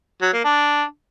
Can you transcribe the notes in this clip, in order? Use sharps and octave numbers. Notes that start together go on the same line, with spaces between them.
F#3
A#3
D4